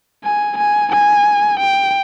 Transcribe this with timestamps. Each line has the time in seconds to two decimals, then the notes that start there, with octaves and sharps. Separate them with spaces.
0.24 G#5
0.58 G#5
0.92 G#5
1.60 G5